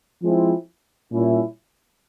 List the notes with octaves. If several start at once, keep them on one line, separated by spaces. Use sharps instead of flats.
F3 G#3 C4 E4
A#2 G3 C#4 E4